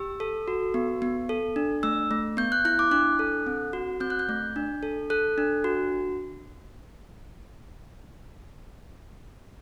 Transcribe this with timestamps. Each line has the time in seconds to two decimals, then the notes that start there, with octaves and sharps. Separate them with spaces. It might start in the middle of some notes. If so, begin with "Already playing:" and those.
Already playing: G4 E6
0.20 A4
0.48 F#4
0.74 B3
1.02 B3
1.29 A4
1.56 D4
1.83 A3 E6
2.11 A3
2.37 B3 G6
2.52 F#6
2.65 E4 F#6
2.79 D6
2.91 D4 F#6
3.19 A4
3.46 C4
3.73 F#4
4.00 C4 G6
4.10 F#6
4.19 G6
4.29 A3
4.56 D4
4.83 A4
5.10 A4 F#6
5.38 D4
5.64 F#4